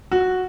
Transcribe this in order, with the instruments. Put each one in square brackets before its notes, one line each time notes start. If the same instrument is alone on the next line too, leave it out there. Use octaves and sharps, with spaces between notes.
[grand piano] F#4